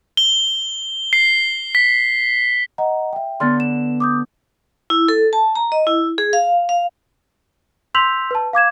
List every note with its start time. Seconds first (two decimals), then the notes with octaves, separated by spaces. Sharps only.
0.17 G7
1.13 C7
1.75 B6
2.78 D#5 F#5 A#5
3.13 E5 G5
3.40 D3 B3 C6 F6 A6
3.60 E7
4.00 D6 D#6 G6
4.90 E4
5.08 A4
5.33 A5
5.55 A#5
5.72 D#5
5.87 E4
6.18 G#4
6.33 F5
6.69 F5
7.95 C6 E6 G6 B6 F7 F#7
8.31 B4 A5
8.53 F5 D6 G#6 E7